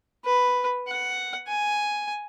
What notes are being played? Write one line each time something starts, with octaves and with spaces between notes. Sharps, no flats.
B4
F#5
G#5